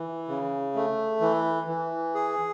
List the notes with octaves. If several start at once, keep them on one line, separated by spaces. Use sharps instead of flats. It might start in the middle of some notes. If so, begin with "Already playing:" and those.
Already playing: E3
C#3
A3
E3
E3
G#4